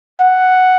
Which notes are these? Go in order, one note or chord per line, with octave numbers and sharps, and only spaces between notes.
F#5